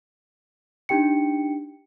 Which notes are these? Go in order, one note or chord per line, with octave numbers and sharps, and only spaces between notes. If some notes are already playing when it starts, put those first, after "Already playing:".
D4 D#4 G4 G5 C#7